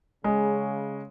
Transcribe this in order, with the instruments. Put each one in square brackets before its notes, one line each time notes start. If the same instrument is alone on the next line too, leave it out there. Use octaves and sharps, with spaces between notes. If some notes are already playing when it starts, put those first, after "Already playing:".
[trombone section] C#3 [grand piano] G#3